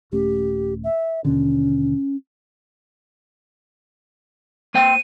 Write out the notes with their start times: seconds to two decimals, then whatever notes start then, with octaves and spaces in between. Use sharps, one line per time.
0.12 D#1 A3 C#4 G4
0.84 E5
1.25 D#2 B2 D3 C#4
4.74 A#3 C5 G5 D#7